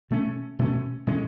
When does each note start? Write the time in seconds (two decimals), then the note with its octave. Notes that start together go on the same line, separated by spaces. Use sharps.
0.11 B2 A3 C#4
0.59 B2 A3 C#4
1.07 A2 G#3 C#4